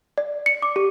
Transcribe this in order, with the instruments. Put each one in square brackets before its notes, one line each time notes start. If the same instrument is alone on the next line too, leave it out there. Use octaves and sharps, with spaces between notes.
[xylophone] D5
C#7
D6
G4